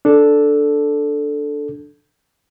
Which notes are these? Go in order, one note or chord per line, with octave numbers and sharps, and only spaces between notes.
D4 A4